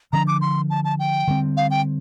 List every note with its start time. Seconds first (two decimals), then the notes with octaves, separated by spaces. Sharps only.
0.13 D3 F3 A#3 D4 A#5
0.27 D6
0.41 C6
0.70 A5
0.84 A5
0.99 G5
1.27 D3 G3 C4
1.57 F5
1.71 G5